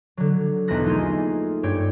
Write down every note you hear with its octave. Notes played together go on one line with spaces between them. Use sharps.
D3 F#3
B1 E2 B3 A5 F#6 A#6
A3 A#3 D#4 F4 G#4
G2 G4 C#5 G5